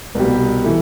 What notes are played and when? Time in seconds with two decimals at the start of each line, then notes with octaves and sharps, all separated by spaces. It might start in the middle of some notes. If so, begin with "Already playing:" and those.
0.15 C2 B2 G3
0.64 E3 A3